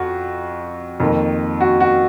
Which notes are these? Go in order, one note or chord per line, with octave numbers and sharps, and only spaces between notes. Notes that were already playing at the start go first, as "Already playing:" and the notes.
Already playing: F2 F#4
F2 D#3 A#3
F#4
F#4